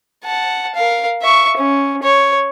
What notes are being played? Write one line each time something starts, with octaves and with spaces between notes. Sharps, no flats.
F#5 A5
A#4 F5
E5 C#6
C#4
C#5